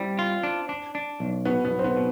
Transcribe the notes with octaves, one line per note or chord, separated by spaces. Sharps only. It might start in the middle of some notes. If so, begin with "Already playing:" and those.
Already playing: G3 C4 E4
F4
D4
D4
D4
B1
B2 B3
B3
B1
C4
B3
B2